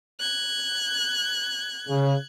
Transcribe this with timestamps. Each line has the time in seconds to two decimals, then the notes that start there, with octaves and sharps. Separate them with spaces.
0.19 F#6 G#6
1.89 C#3